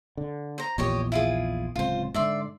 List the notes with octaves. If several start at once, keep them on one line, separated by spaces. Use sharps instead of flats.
D3
C5 A#5
A#1 E2 A#2 G4 C#5 D#5
E4 F4 G#4
D1 C#2 C4 F4 C5
G#2 D3 D5 E5 C6